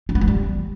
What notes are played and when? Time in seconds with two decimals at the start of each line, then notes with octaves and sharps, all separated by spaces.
0.09 C4
0.15 B3
0.21 E3
0.28 G3